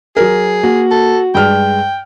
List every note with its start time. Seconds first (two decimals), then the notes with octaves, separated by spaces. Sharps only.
0.17 F#3 G#4 A#4
0.63 A#3 F#4
0.91 A4
1.35 G2 G#3 G5 F6